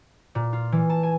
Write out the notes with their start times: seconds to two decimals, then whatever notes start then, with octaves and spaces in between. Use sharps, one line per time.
0.35 A#2
0.53 F4
0.72 E3
0.90 A5
1.03 G#5